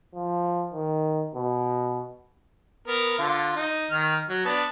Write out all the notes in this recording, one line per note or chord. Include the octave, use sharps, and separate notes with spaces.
F3
D#3
B2
B3 A#4
D3 F4
D#4
D#3 F6
F#3
B3 D4 A5